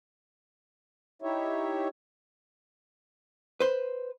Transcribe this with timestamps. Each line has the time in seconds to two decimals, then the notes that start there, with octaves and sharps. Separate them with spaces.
1.22 D#4 E4 G4 C#5 E5
3.60 B4 C5